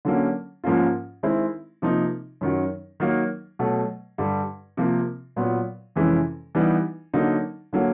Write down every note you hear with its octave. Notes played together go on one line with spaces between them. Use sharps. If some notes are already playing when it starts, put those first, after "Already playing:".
D3 F#3 A#3 C#4
G#2 F3 A#3 C#4 F4
D#3 G#3 C4 E4
C3 F3 A#3 D#4
F#2 D#3 F#3
D#3 F#3 A#3
B2 F#3 A3
G2 D3 G3
C3 F3 A#3
A#2 F#3 B3
F2 C3 E3 G#3 C#4
E3 G3 B3 D#4
D3 F#3 A#3 D#4
D3 F#3 A#3